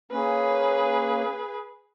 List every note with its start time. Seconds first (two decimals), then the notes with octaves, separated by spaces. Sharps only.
0.12 A#3 C#4 G#4 B4